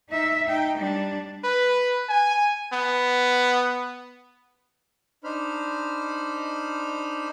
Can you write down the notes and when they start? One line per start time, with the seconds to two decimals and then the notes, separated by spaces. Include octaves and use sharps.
0.10 D#4 E5
0.47 D#4 G5
0.79 G3 D4
1.44 B4
2.09 G#5
2.73 B3
5.24 D4 D#4 C5 B5 F6